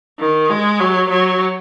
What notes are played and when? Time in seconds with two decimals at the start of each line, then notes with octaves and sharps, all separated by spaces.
0.19 D#3
0.49 G#3
0.80 F#3
1.10 F#3